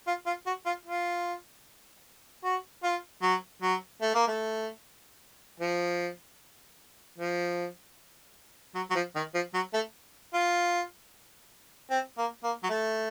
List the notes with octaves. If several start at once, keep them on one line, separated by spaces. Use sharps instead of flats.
F4
F4
F#4
F4
F4
F#4
F4
F#3
F#3
A3
A#3
A3
F3
F3
F#3
F#3
F3
D#3
F3
F#3
A3
F4
C4
A#3
A#3
F#3
A3